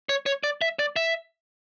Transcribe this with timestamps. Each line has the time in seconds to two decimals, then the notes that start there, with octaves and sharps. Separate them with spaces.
0.09 C#5
0.26 C#5
0.44 D5
0.62 E5
0.79 D5
0.96 E5